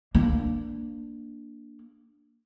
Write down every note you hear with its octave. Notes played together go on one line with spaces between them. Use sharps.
A#3 D4